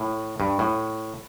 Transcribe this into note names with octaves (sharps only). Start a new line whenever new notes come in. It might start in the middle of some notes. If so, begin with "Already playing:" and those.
Already playing: A2
G2
A2